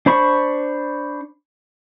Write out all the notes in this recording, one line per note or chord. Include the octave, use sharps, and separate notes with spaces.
D4 C5 B5 C#6